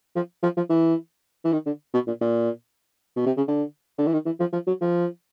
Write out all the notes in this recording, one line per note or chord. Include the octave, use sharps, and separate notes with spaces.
F3
F3
F3
E3
E3
D#3
D3
B2
A#2
A#2
B2
C3
C#3
D3
D3
E3
D#3
E3
F3
F3
F#3
F3